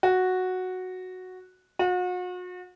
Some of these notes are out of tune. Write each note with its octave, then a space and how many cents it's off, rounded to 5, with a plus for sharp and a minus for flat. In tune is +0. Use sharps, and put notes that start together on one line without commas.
F#4 -5
F#4 -40